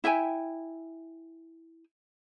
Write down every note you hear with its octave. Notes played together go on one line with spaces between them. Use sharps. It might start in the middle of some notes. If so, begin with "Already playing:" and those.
E4 E5 G5 G#5